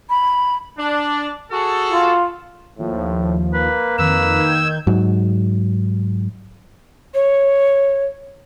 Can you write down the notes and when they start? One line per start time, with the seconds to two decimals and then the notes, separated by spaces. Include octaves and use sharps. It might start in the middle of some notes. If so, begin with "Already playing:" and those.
0.10 B5
0.77 D4
1.52 F#4 G#4 A4
1.92 F4
2.79 D#2 A2 F3
3.53 A#3 B4
3.98 F2 D#3 B4 E6
4.39 D#3 G6 G#6
4.87 G#2 F#3
7.14 C#5